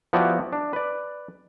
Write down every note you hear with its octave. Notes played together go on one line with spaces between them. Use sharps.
F3 B3 E4 F#4 G4 D5
D4
B4 D5